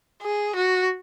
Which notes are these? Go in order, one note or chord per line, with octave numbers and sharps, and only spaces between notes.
G#4
F#4